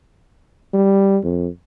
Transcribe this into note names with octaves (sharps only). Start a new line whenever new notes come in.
G3
F2